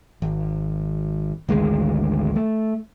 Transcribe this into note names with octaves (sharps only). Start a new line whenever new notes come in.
G#1
G#1 D2 G#3
A3